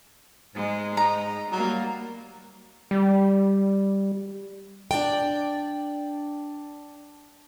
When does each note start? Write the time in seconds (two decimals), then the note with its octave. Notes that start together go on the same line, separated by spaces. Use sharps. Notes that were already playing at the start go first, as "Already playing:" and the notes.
0.55 G#2 G#3
0.97 D#4 A#5
1.52 F#3 G3 A#3
2.91 G3
4.91 D4 D5 G5